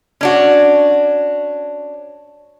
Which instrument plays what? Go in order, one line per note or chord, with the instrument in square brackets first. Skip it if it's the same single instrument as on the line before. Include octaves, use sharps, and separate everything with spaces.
[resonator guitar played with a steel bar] C#4 D4 F#4